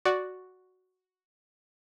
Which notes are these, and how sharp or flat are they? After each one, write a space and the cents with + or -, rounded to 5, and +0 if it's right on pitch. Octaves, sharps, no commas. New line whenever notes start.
F#4 +0 D5 +0